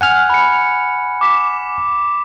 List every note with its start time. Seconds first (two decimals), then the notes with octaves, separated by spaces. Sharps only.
0.01 F#5 G#5 F6
0.30 B5 C#7
1.21 D6 B6 E7